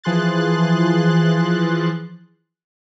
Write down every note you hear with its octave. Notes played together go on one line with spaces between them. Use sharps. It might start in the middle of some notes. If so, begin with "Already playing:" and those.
E3 F3 G#4 C6 F#6 A6